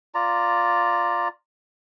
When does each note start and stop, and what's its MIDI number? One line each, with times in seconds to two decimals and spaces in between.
0.15 1.28 65
0.15 1.28 74
0.15 1.28 82